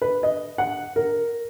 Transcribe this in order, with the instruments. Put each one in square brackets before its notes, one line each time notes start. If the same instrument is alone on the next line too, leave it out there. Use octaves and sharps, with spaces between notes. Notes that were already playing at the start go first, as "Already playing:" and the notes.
[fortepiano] B4
D#5
F#5
A#4